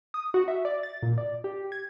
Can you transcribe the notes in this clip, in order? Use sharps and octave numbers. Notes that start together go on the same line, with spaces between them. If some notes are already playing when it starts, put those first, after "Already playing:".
D#6
F#4
E5
D5
A6
A#2
D5
G4
G#6